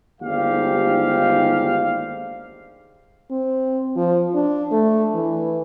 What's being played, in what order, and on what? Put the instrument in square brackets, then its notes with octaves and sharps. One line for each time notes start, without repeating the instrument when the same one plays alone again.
[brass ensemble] G1 D#2 G#2 G3 G4 F5
[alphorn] C4
F3
D4
A3
E3